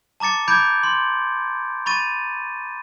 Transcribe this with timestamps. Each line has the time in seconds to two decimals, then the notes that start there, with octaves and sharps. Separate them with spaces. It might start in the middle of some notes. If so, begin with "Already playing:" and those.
0.20 A5 A#5 D6 A6 C#7
0.48 B5 D6 G6 G#6 D7
0.83 C6
1.86 B5 C#6 A6 D#7